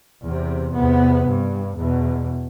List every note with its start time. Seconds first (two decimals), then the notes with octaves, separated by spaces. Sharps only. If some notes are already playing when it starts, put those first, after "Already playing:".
0.24 E2 C3
0.75 E2 C3 B3
1.27 G2
1.77 E2 B2